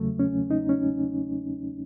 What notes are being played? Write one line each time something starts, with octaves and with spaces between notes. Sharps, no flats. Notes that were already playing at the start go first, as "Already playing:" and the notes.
Already playing: E2 C#3 F#3 A3
C#4
D#4
C#4